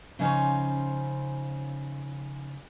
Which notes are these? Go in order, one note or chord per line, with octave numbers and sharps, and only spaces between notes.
C#3 F3 C#4 D#4 C5